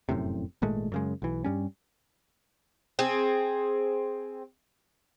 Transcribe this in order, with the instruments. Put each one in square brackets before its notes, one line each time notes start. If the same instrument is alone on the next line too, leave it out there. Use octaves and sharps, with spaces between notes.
[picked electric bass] F1 F#2 A2 C3
G#1 A#2 G#3 A3
F#2 C#3 G#3
B1 E3
G2 G3 C#4
[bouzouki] C4 G#4